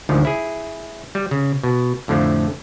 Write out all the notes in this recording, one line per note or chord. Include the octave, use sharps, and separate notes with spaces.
D2 G#2 D3 D#3 F3
E4 G#4
G3
C#3
B2
F2 A2 D3 F3 A3